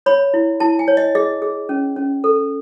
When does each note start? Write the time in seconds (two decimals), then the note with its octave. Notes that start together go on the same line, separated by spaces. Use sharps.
0.06 C#5 B5
0.34 E4
0.60 E4 A5
0.79 G#5
0.88 C#5
0.97 D#5
1.15 G#4 D#5
1.42 G#4
1.69 C#4
1.96 C#4
2.24 A4